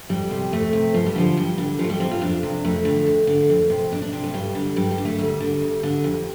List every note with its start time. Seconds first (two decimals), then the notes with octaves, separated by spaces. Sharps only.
0.09 F2 G3
0.31 C3
0.52 F2 A3
0.73 C3
0.94 G2 F3
1.06 G3
1.15 D3 F3
1.37 G2 G3
1.58 D3
1.79 F2 F3
1.84 A3
1.90 G3
2.00 C3 C4
2.11 F4
2.21 F2 D4
2.43 C3
2.65 F2 A3
2.85 D3
3.07 F2
3.27 D3
3.50 F2
3.70 C3
3.92 F2 D4
4.02 D4
4.13 C3 D4
4.24 A3
4.34 G2 G3
4.55 D3
4.76 G2 G3
4.91 G3
4.98 D3
5.05 A3
5.19 D2 G3
5.40 D3
5.61 D2
5.83 D3
6.04 F2